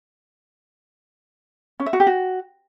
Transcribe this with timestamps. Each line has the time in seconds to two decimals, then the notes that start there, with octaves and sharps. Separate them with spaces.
1.80 C#4
1.86 E5
1.93 F#4
2.00 G4
2.07 F#4